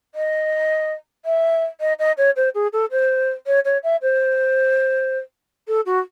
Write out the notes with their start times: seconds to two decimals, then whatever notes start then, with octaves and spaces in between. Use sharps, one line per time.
0.15 D#5
1.25 E5
1.80 D#5
1.99 D#5
2.18 C#5
2.36 C5
2.54 G#4
2.73 A4
2.91 C5
3.47 C#5
3.65 C#5
3.83 E5
4.02 C5
5.68 A4
5.86 F#4